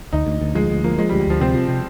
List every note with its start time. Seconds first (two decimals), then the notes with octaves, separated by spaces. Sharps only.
0.13 D2 D#4
0.27 D2
0.41 D2
0.55 F3 G#3
0.70 D2
0.84 F3 A#3
0.98 F3 G#3
1.09 G3
1.12 D2
1.20 G3
1.27 D2 F3
1.40 C3 C4
1.54 F3
1.69 C3